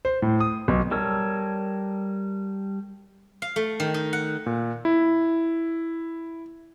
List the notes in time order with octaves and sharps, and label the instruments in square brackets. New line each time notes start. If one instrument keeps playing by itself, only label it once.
[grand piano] C5
A2
D#6
B1
[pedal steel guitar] G3 A4 A#4 C#5 E6
[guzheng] F5
A3
D#3
D#4
F#5
[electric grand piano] A#2
E4